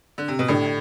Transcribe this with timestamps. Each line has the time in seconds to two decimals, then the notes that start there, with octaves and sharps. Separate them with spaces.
0.18 D3
0.28 C3
0.39 B2
0.48 A2 D3 A3 D4 G4